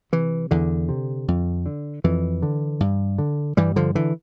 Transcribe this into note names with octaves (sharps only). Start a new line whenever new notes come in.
C3 E3
E2 D3
C3
F2
D3
F2 E3
D3
G2
D3
G2 E3 G3
D3 F3
D3 E3